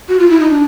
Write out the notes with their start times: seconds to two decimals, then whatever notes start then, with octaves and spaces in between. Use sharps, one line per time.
0.09 F#4
0.19 F4
0.30 E4
0.40 D#4
0.50 D4